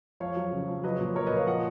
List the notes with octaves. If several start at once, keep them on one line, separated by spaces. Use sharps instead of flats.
F2 C#5 F5
F#3
C#3
F2
F#3 B4 D#5
A#2
F#3 A#4 C#5
B4 D#5
A#2
C#5 F5
F3 D#5 F#5